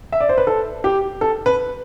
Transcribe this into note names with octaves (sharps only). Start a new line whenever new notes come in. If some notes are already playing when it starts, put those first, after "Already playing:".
E5
D5
C5
B4
A4
G4
A4
B4